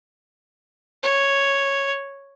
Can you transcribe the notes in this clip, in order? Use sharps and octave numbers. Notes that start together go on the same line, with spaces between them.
C#5